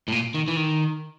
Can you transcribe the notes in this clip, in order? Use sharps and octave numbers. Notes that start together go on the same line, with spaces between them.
A2
A#2
D#3
E3
D#3